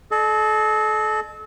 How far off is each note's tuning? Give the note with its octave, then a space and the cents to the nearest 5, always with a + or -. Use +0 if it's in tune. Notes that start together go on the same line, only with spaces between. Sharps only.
A4 -35 D#5 -40